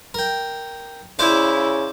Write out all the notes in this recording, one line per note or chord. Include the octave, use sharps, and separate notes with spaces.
A#4 G5
C#3 E4 C5 D5 F5